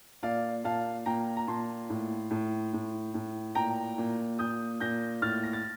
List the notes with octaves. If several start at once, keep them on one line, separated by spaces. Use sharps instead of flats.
A#2 D5 F5
A#2 F5 A5
A#2 G5 A#5
A#5
A#2 A5 C6
A2
A2
A2
A2
A#2 G5 A#5
A#2
A#2 D#6 G6
A#2 G6 A#6
A2 F6 A6
A#6
A6